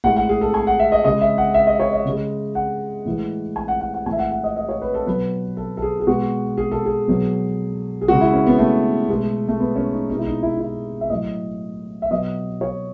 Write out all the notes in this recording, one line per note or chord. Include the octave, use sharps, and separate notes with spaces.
A2 G#3 F#5
F#5
G#4
A4
G#5
F#5
E5
D#5
C#3 G#3 D#5
E5
F#5
E5
D#5
C#5
D#5
C#3 G#3
F#5
A2 E3 G#3
G#5
F#5
F#5
F#5
A2 E3 G#3 G#5
E5
F#5
F#5
D#5
D#5
C#5
B4
A4
B2 F#3 B4
A4
A4
G#4
G#4
B2 G#3 F#4
G#4
A4
G#4
B2 F#3
G#4
C#3 G#3 F#4
E4
C#4
B3
A3
B2 G#3
A3
B3
C#4
D#4
B2 G#3 D#4
E4
D#4
E4
D#4
E4
E5
A2 F#3 D#5
E5
B2 F#3 D#5
C#5